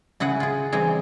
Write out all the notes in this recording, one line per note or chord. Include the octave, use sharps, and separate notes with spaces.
C#3 E4 G#4 F#5
F4 G#4
E3 G3 C4 G#4